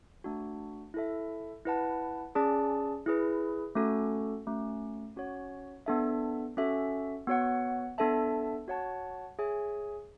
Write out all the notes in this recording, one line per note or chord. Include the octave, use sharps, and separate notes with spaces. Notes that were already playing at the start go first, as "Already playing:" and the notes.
A3 D4 F#4
E4 A4 E5
E4 B4 F#5 A5
C#4 G#4 D5 A5
E4 G#4 B4
A3 C#4 F#4 A4
A3 C#4 F#4
C#4 F#4 C#5 F#5
B3 D4 A4 E5
C#4 F#4 A4 E5
B3 F#4 C#5 F#5
B3 D4 A4 E5 A5
F#4 C#5 F#5 A5
G#4 C#5 E5 G#5